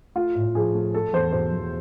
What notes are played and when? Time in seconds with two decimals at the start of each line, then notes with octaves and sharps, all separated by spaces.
0.16 A3 F4
0.35 A2
0.55 F3 G#4
0.74 A3
0.94 A3 A4
1.13 E2 C5
1.33 B2 C5
1.52 E2